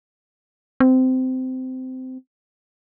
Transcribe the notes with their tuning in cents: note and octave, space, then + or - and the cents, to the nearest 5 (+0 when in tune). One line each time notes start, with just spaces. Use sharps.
C4 -20